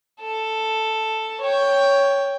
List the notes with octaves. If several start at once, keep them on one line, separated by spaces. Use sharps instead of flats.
A4
C#5 G5